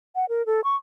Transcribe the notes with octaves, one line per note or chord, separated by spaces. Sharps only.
F#5
A#4
A4
C#6